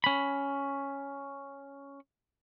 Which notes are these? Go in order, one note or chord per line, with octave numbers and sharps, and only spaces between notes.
C#4 B5